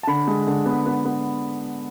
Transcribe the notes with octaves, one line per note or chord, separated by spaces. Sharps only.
A5
D3 B5
G#3
D3
B3
B3
B3